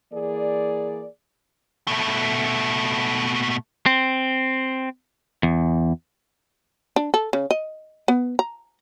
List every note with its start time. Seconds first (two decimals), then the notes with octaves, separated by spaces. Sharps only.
0.13 E3 A#3 G#4 D5
1.87 B2 A3
3.86 C4
5.43 E2
6.96 D4
7.14 A4
7.33 C#3
7.51 D#5
8.08 B3
8.39 A#5